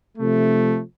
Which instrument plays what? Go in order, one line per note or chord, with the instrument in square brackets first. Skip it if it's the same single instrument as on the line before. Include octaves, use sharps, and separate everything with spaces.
[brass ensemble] C3 F3 A3